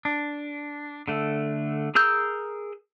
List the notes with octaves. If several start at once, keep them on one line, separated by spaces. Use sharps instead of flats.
D4
D3 A3
G#4 A#4 E6 G6